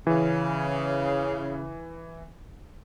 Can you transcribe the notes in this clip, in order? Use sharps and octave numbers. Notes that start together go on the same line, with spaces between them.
C#3 E3